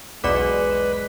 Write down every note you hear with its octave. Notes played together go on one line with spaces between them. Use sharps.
B1 E2 G#3 B4 D5 D6 E7